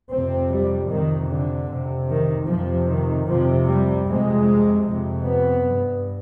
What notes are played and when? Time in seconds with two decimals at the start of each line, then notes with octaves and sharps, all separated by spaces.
0.11 F2 C3 C4
0.51 G3
0.91 F2 C3 D#3
1.30 D3
1.70 F2 C3
2.10 D#3
2.48 F2 C3 F3
2.88 D#3
3.28 F2 C3 F3
3.68 G3
4.07 F2 C3 G#3
4.87 F2 C3
5.26 B3
5.66 G2